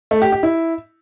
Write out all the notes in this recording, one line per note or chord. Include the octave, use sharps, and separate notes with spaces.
A3
G4
G4
E4